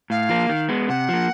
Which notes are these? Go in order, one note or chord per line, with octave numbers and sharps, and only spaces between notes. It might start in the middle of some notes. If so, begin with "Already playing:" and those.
A2 F5
F3 A#3
D#3
G#3 B3
C3 F#5
F3 A#3